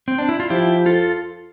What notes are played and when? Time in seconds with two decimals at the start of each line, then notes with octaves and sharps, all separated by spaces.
0.08 C4
0.18 D4
0.29 E4
0.40 F4
0.50 F3 E4 G4
0.86 F4 A4